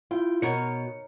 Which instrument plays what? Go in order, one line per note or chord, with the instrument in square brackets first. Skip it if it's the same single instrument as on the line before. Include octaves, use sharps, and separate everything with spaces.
[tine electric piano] E4 F4 [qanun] G5
[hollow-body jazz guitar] B2 [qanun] D#4 A#4 C#5 [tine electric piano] C#7